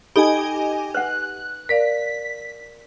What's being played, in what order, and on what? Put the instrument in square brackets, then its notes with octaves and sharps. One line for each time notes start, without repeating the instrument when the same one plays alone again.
[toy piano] D#4 A4 B5 [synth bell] G4 D#5 G#5
[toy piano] B4 F#5 [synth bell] F#6
[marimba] A#4 D5 F5 [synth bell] B6